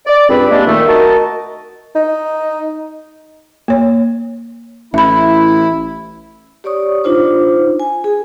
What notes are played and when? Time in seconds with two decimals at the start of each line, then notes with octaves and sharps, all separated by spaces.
0.06 D5
0.29 C#2 G2 C4 B4
0.50 G3 G#3 A#3 D4
0.66 A#2 D#3 A3
0.88 F#4 A#4 D#5 A5
1.95 D#4
3.68 A#3 C#5
4.94 A1 E4 E5 B5
6.64 G4 C#5 D5 C#6 D#6
7.04 D4 D#4 F4 C5
7.80 G#5
8.04 G#4